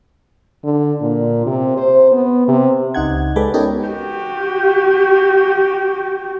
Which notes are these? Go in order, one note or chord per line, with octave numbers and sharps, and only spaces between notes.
D3
A#2
C3
C5
B3
C3
C#2 D#4 F#5 G#6
G#3 G4 A4 B4 D5
B3 C#4 D#4 G4 A4 A#4
F#4 G4